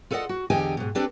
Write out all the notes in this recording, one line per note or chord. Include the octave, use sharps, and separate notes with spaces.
F4 A4 B4 D5 D#5 F#5
F#4
E2 D3 G4 D#5 G5 G#5
G#2 B2
C4 D4 G4 A4 B4 D5